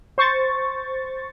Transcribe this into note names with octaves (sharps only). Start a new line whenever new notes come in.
C5 C#6 A6